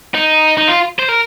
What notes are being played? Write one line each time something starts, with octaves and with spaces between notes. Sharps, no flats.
D#4
D#4
F4
C5
A#4